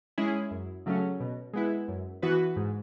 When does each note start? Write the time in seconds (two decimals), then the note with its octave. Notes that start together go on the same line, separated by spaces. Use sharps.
0.18 G#3 C#4 E4 G#4
0.51 F#2
0.86 C#3 F#3 A3 C#4
1.20 B2
1.53 G#3 B3 E4
1.88 F#2
2.22 E3 B3 F#4 B4
2.56 G#2